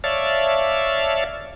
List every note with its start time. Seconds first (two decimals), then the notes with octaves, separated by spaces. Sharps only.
0.04 C#5 D5 E5 F5 A5